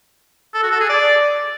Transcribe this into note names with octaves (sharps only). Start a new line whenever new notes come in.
A4
F#4
A4
G#4
D5